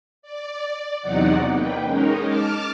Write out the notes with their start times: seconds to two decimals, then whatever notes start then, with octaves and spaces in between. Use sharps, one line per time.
0.22 D5
1.02 E2 C3 F#3 D#4 D5 F#5
1.51 A#3 B4 G5
1.83 G#3 C#4 D#4 A#4
2.27 A5 D6 F6